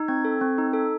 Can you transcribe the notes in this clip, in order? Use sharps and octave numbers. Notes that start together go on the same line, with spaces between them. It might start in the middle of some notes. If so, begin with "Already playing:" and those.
Already playing: D#4
C4 G#6
A4
C4
D#4
A4